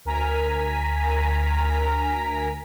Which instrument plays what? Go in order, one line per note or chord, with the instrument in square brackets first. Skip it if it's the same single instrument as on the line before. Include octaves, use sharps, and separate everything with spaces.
[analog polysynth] D2 A#4 G#5 A#5 B6